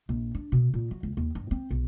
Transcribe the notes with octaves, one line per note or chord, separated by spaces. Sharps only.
A#1
D4
B2
A#2
F#3
C#2
D#2
G2
C4
B1